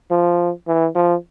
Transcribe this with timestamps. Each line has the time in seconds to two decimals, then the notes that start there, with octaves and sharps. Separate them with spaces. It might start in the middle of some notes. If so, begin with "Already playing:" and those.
0.11 F3
0.68 E3
0.95 F3